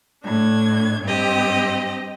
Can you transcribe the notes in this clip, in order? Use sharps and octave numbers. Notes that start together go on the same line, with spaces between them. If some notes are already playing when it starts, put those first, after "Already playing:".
A2 D4 G#6
G2 C4 G4 D#5